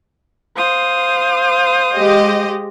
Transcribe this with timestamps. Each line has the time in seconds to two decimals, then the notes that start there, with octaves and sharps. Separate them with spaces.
0.54 C5 F5 D#6
1.95 G#3 G4 D#5